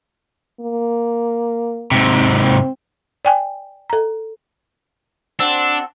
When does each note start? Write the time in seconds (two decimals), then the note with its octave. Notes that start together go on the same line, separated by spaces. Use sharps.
0.61 A#3
1.91 G#2 C3
2.29 C4
3.25 D5 G5 G#5
3.90 A4 A#5
5.39 C4 D4 F#4 A4